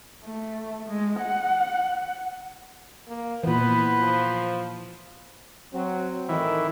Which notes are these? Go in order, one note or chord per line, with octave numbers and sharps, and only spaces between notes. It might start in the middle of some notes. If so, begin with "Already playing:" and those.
A3
G#3
F#5
A#3
A#2 E3 B3 B4 C5
F3
F#3 C4
A2 D#3 E3